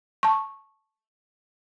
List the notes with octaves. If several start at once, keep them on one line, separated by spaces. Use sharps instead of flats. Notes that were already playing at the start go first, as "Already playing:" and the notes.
A5 C#6